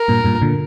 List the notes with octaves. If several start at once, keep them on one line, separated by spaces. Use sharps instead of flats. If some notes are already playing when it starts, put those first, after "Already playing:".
Already playing: A#4
G2 A#2
G2 A#2
A#2 D3